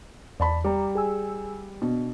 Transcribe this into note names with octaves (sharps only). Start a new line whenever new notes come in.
E2 D5 A5 B5
G3 A#5 D6
G#4 G#5 E6
B2 D4